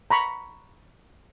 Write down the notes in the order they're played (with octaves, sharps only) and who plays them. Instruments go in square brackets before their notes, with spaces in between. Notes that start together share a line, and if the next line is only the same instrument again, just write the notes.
[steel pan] A#5 B5 C#6